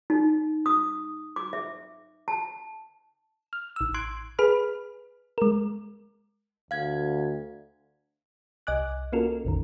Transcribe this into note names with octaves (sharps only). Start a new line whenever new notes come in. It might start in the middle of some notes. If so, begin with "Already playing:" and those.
D#4
D#6
D6
E5
A5
F6
A1 E6
C6 F#6 G#6 D7
G#4 B4 B5 F6
G#3 A#4
D2 F5 G#6
C2 D#5 G#5 D6 F#6
A#3 C#4 F4 F#4 A4 A#4
A#1 F2 D#3